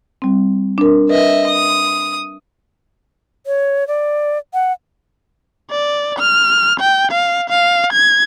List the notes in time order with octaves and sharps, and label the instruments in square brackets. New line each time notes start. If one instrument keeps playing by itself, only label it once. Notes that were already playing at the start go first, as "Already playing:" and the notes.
[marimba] G3 C4
D4 A#4
[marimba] B4 [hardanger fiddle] D#5 E5
[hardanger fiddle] D#6
[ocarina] C#5
D5
F#5
[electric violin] D5
F6
G5
F5
F5
G#6